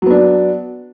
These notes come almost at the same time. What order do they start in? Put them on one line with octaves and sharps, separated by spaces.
F#3 B3 D4